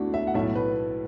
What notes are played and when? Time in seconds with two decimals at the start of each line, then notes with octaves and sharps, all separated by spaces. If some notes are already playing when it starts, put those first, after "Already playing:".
Already playing: D2 D3 A3 D4 E4 F#4
0.14 E5
0.27 F#5
0.34 B1 A2 A3 E5
0.55 B4